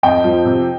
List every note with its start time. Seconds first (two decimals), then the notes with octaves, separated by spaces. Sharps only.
0.03 F2 D#5 G5
0.24 F3
0.45 C3